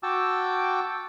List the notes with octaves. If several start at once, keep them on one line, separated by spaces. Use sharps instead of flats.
F#4 G5 A5 D6 E6